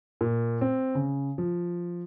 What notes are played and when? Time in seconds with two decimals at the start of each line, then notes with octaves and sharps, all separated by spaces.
0.21 A#2
0.61 C4
0.95 C#3
1.38 F3